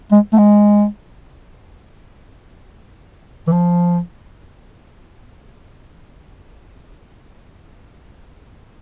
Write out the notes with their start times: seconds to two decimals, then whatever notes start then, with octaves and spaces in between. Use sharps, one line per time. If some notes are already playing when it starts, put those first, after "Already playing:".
0.12 G#3
0.33 A3
0.38 G#3
3.47 E3
3.52 F3